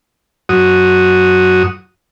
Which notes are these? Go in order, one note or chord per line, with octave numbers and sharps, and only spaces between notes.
F#2 F#4 D#6